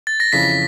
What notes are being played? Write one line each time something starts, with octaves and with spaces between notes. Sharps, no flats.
A6
A#6
F2 C#3 E3 B6